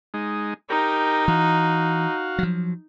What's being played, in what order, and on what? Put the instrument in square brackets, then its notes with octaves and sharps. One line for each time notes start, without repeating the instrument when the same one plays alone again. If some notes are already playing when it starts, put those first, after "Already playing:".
[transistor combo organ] G#3 D#4
[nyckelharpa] D#4 [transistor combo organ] G4 A#4
[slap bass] E3 [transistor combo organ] F#4 F5
[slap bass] F3 F#3